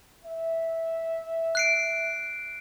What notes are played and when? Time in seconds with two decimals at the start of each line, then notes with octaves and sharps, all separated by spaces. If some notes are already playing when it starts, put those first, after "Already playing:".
0.25 E5
1.55 F#6 C7 D7